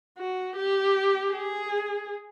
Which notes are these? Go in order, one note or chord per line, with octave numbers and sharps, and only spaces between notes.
F#4
G4
G#4